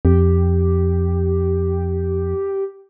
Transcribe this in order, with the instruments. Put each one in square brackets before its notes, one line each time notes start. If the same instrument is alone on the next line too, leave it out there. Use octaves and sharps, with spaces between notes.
[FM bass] F2 [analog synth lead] G4